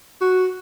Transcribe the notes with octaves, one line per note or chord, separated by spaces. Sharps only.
F#4